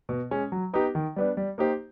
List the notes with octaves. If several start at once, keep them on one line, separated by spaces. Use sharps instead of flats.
B2
G#3 C#4
F#3
B3 D#4 G4
D#3
G3 B3 D4
G3
A#3 D#4 G4 C5